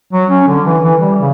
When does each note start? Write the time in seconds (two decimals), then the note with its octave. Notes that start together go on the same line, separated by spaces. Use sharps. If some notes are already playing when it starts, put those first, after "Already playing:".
0.13 F#3
0.30 C#4
0.47 D3
0.65 E3
0.83 E3
1.01 G3
1.18 C#3